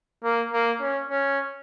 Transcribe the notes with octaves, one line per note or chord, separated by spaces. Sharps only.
A#3
A#3
C#4
C#4